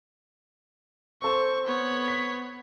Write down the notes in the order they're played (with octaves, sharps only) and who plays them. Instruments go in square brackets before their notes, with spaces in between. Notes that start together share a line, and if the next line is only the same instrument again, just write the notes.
[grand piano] C4 A4 C5 [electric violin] C#6
[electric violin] B3 C#5
[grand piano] B6